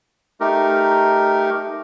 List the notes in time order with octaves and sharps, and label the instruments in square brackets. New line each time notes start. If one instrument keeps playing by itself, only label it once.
[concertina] A3 D#4 G4 A#4